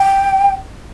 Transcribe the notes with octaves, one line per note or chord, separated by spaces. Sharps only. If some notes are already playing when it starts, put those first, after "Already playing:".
Already playing: G5